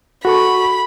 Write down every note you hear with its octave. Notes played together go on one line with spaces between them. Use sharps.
F#4 A4 B5 C#6